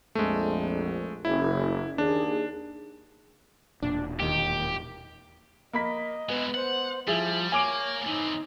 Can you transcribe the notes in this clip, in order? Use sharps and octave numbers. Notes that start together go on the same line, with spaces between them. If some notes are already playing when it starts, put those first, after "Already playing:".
A#1 F2 G#3 A3
F#1 E4
D#2 D4 G#4
E1 A#2 D4
D#2 D#3 G4
A#3 D#5 B5 B6
G#3 B3 E4
C5 F#5
F3 G3 E4 G#4
A#3 C#5 G#5 D6 D7
E3 C4 D#4